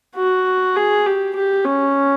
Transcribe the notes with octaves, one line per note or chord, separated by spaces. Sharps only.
F#4
G#4
G4
G4
C#4